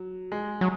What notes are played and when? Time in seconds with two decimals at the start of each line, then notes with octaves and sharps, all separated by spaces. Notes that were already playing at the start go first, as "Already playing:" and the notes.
Already playing: F#3
0.32 G#3
0.61 F#3